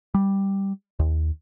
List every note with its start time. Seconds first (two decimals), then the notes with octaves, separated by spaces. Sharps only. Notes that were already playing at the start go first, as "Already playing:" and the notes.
0.14 G3
0.99 D#2